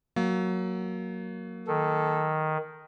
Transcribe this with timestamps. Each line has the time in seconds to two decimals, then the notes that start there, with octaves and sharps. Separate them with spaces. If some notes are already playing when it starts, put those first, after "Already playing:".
0.16 F#3 A#3
1.68 D#3 A4